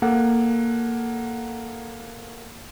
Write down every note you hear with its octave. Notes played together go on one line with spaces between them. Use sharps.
A#3 A4 F#5